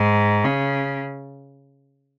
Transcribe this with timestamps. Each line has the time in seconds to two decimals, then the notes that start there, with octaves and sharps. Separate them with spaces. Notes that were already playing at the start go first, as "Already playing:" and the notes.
Already playing: G#2
0.44 C#3